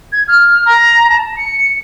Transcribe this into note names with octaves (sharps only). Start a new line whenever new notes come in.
G#6
F6
A#5
A5
C#7